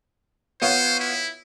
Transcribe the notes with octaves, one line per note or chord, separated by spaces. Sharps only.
B3 F4 C5 C#5
E4